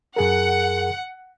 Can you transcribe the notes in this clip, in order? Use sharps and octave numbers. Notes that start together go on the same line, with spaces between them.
F#2 G#4 A#4 F#5